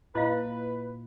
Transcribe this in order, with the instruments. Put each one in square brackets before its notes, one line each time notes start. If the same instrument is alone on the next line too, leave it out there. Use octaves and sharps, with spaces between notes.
[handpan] A#2 [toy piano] E4 D#5 F5 [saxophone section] B4